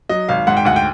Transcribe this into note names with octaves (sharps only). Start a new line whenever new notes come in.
F#3 D#5
G#1 F5
G#2 F#5
G5
D2 F#5
G5